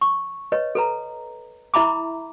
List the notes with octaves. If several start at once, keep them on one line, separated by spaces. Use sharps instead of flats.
C#6
B4 C#5 D#5
A4 B4 A#5
E4 E5 A#5 B5 D6